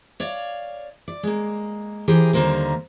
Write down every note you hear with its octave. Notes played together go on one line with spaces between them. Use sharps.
C#5 D5 F5
D5
G#3 A#3
E3 G4 G#4 A#4 C5
D#2 D3 G3 A#3 A#4 C5